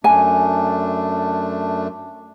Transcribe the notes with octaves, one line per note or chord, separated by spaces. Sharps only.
F#2 A3 D4 G#5